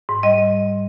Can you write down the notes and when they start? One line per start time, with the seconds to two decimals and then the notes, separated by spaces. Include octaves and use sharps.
0.09 G#2
0.23 G3 D#5